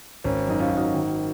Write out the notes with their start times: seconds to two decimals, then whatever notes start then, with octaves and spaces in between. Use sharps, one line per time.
0.24 G#1 C#4
0.48 F#2 D#4
0.59 C#4 F4
0.72 G#1 F4
0.77 D#4 F#4
0.94 D#3